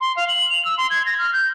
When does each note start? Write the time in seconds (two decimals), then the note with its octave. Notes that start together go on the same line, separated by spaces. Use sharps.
0.01 C6
0.17 F5
0.28 F#7
0.50 F7
0.65 E6
0.78 C6
0.90 G#6
1.06 A#6
1.18 F6
1.33 G6